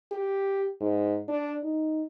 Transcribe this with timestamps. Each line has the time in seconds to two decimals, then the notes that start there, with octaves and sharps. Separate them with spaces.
0.12 G4
0.81 G#2
1.28 D4
1.64 D#4